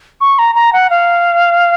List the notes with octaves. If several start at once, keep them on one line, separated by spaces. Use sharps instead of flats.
C#6
A#5
A#5
F#5
F5